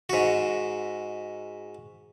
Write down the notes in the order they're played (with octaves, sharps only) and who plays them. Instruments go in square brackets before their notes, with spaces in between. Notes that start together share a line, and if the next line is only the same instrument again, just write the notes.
[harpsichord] G#2 F#4